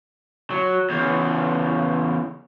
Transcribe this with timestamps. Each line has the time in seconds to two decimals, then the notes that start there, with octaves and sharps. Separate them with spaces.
0.51 F#3
0.90 E2 C#3